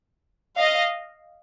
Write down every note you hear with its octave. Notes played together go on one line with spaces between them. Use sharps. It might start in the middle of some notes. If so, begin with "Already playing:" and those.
D#5 F5